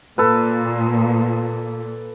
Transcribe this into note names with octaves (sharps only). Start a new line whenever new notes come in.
A#2 A4 B4